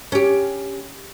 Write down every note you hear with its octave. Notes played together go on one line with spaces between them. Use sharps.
C#4 G4